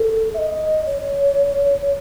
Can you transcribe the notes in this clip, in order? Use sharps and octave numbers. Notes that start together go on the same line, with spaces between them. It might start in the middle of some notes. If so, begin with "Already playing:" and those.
Already playing: A4
E5
D#5
C#5